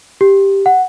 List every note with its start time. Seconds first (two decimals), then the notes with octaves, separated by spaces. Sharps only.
0.21 G4
0.66 F#5